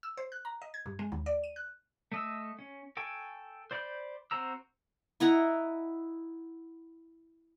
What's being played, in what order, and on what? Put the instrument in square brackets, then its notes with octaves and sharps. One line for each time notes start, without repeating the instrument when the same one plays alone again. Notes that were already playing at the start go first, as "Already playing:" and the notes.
[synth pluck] E6
C5
F#6
A#5
D#5
G#6
G2
G#3
D#2
D5
D#7
F#6
[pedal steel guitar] A3 D#5 E6
C#4
A4 G5 G#5 C#6
C5 D5 B5 C#6 G6
C4 F#4 C5 A#5 E6
[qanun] E4 D#5 F#5 A#5